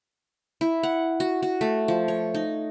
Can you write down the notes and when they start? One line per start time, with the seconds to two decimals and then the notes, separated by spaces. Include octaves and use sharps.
0.61 E4
0.83 F#5
1.20 F#4
1.43 F#4
1.61 A3
1.88 F3
2.08 C#5
2.34 D#4